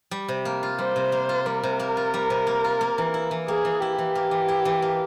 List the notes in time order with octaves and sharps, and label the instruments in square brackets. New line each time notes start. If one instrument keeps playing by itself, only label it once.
[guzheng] G3
C3
A#3
F4
[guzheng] G3 [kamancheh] C5
[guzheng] C3
A#3
F4
[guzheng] G3 [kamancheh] A#4
[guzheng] C3
A#3
F4
G3
C3
A#3
F4
A#3
E3
E4
E3
[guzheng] A#3 [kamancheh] G#4
[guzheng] E3
[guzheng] E4 [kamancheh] G4
[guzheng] E3
A#3
E3
E4
E3
A#3